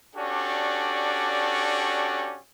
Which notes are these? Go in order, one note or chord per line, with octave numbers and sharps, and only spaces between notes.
C#4 D4 F#4 G4 A4 D5